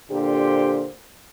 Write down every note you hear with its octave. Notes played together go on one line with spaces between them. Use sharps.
A#2 D3 G4 C5